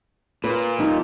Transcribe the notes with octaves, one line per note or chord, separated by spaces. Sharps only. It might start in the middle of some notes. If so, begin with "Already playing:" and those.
A#2 B4
F3 G3 D#4